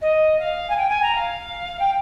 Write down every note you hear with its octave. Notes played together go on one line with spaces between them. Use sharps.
D#5
F5
G#5
G5
G#5
A#5
F5
G5